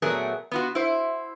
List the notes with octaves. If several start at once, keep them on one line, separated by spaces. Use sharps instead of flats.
A#2 F#3 A3 B3 G#4 A#4
B3 F4 F#4
E4 C5